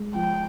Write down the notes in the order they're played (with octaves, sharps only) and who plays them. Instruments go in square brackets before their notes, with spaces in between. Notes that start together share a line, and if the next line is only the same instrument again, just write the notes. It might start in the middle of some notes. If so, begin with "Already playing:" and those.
Already playing: [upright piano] G#3
[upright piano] F3 [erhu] G5